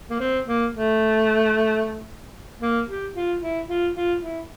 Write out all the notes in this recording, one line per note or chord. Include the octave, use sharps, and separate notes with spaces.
A#3
C4
A#3
A3
A#3
G4
F4
E4
F4
F4
E4